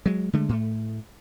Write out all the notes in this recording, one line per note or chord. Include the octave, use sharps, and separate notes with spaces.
F#3 G#3
D3 G#3 A3
A2 A3